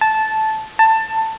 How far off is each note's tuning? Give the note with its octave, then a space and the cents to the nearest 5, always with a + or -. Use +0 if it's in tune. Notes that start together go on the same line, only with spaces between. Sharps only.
A5 -10
A5 +15